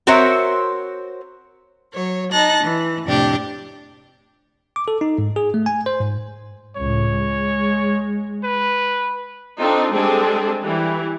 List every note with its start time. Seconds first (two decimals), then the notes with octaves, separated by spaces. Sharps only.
0.07 C4 F#4 A#4 C5 C#5 E5
1.93 F#3 C#5
2.31 D#4 A5 F#6 A#6
2.64 E3
3.04 F2 A2 C3 D4 G4
4.76 D6
4.88 A4
5.01 D#4
5.18 G#2
5.36 G#4
5.54 A3
5.66 G#5
5.86 C5
6.01 G#2
6.77 C#2 A2 C#5
7.15 G#3
8.44 B4
9.58 C4 D4 D#4 F4 A4
9.91 G3 G#3 C4 D4 G#4 A4
10.64 E3 G3